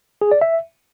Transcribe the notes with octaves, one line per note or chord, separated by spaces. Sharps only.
G#4
D5
E5